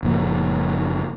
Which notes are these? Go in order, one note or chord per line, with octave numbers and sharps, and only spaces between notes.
F#1 A#2 F3 A#3